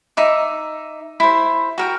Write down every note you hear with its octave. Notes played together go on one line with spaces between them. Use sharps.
D#4 E5 D6
E4 C5
F#4 A#4 G5